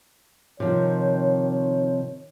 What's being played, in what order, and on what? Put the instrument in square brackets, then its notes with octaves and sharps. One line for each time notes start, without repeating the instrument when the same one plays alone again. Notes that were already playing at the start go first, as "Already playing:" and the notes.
[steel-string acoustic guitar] C3 F3 [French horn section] D#3 C#5